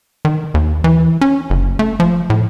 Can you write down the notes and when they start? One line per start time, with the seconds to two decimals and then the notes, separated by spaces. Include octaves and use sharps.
0.25 D#3
0.54 D#2
0.84 E3
1.21 C#4
1.50 F#1
1.79 A3
2.00 F3
2.30 A2